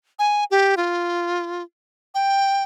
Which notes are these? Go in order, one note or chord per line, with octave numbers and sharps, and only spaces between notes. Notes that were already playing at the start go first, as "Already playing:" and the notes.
G#5
G4
F4
G5